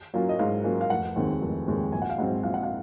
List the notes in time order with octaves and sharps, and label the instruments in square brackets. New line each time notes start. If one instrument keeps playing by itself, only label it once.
[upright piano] F#3 A#3 C#4 F4
D#5
G#2 F5
F#3 A#3 C#4 F4
F5
F1 F#5
D#2 D#3 G#3 C4
F1
D#2 D#3 G#3 C4
A#1 G#5
F#5
F5
G#2 F#3 C4 F#5
A#1 F5
F#5
F5